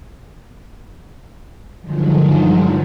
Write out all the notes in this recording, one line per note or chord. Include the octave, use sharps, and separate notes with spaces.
G2 D3 D#3 F3 F#3 G#3